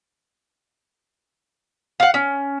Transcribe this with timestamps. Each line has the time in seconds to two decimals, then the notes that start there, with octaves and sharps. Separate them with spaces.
2.00 F5 F#5
2.14 C#4